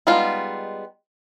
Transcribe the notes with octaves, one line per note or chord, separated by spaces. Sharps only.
G3 G#3 B3 D#4 F4